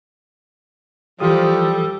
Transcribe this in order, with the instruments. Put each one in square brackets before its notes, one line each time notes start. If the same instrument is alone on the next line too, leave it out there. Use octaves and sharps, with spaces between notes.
[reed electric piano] E3 G4 D#6 [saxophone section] F3 [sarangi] G3 [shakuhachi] A4